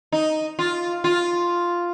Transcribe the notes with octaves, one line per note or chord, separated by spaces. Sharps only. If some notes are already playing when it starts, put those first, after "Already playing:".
D#4
F4
F4